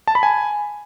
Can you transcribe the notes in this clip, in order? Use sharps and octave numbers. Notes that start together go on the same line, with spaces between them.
A5
B5
G#5